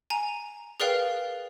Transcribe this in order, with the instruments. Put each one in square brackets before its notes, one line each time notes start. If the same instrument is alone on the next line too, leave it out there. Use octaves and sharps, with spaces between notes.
[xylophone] G#5 A#5
G#4 A#4 B4 D5 F5 G5